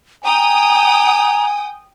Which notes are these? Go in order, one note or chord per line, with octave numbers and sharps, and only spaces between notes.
G5 G#5 A#5 D#6